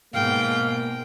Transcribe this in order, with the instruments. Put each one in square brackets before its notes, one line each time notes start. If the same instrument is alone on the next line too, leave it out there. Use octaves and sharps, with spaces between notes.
[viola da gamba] G#2 B2 [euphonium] A#3 [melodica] F5 [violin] G5